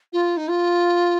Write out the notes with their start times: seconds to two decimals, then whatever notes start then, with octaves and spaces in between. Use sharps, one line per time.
0.13 F4
0.37 D#4
0.48 F4